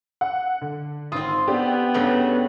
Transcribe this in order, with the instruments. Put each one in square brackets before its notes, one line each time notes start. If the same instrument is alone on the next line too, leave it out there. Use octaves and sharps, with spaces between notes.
[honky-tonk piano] F#5
D3
[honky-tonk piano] G#1 D#6 [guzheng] C4 F4
[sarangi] B3 [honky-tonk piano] D4 G4
[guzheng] G2 C#3 A3